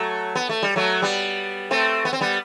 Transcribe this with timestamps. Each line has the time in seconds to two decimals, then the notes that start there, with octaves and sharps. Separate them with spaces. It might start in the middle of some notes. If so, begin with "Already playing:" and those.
Already playing: F#3 A3
0.35 B3
0.49 A3
0.63 G3
0.76 F#3 A3
1.02 G3 B3
1.71 A3 C4
2.05 B3
2.13 C4
2.21 G3 B3